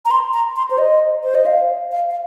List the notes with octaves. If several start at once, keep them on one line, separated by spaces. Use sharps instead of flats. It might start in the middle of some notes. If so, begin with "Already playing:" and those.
A#5
C6
A#5
C6
C5
D#5
C5
D#5
F5
F5
F5